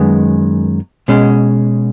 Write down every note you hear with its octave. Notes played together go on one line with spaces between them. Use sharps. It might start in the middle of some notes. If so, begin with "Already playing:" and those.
Already playing: F#2 D#3 G#3 B3
B2 G#3 C#4